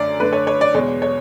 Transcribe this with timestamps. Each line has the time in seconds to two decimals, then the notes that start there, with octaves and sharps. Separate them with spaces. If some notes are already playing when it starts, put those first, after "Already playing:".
Already playing: F#2 D3 A3 D5
0.20 F#2 D3 A3 B4
0.33 C#5
0.47 C#5
0.61 D5
0.74 E2 B2 G#3 C#5
1.02 C#5